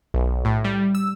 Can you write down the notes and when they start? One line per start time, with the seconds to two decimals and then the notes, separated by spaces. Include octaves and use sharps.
0.14 B1
0.45 A2
0.65 G3
0.95 E6